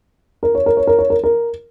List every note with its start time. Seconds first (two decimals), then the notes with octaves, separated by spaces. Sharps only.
0.43 A#4
0.55 C#5
0.66 A#4
0.77 C#5
0.87 A#4
0.99 C#5
1.10 A#4
1.24 A#4